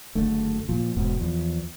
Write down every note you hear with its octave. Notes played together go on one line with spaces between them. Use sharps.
F#1 D3 A3
A#2 F3
E1 G#2 B2
E2 F3